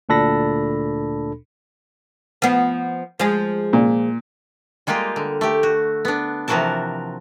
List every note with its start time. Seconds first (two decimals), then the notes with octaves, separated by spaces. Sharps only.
0.09 D2 A#2 D4 A4 B5 A#6
2.42 F3 B3
3.19 F3 G#3
3.73 A#2
4.87 G3 G#3 A#3 F4 G4
5.16 D3
5.41 A3 G4
5.63 F#4
6.05 B3 D4
6.48 C3 E3 F3 F#4 A#4 A5